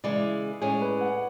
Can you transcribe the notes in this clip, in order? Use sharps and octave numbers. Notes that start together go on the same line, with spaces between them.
C#3 E3 G#3 D5
A2 G#3 C#4 G#4 C#5
B4
F#5